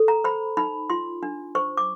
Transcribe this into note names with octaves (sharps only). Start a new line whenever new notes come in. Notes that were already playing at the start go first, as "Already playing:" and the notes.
Already playing: A4
A#5
C5 B5
D#4 B5
F4 C6
D4
C5 C#6
D6